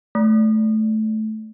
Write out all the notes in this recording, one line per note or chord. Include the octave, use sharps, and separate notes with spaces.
A3